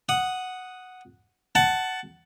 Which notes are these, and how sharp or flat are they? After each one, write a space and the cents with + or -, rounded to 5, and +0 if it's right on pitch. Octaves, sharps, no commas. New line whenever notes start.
F#5 +0 D#6 +0
F#5 +15 A5 +0